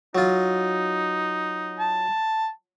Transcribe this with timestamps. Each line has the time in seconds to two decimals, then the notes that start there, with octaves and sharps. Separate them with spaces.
0.15 F#3 D#4 F4
1.79 A5